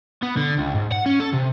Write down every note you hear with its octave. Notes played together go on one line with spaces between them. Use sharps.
B3
D3
C#2
G#2
F#5
C#4
A4
C3